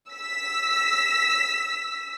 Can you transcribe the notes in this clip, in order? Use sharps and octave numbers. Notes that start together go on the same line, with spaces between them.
E6 B6